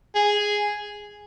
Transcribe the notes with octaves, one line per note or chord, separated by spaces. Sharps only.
G#4